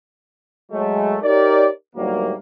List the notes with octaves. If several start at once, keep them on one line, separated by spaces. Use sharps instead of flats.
F#3 G#3 A3
D#4 G4 A#4 C#5 D5
D2 G#2 F#3 G3 A#3